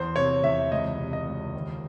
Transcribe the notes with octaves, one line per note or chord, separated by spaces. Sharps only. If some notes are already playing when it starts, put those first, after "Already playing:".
Already playing: E2 C5
C3 C#5
E2 E5
C#2 D#5
C3
D#5
C#2
D#2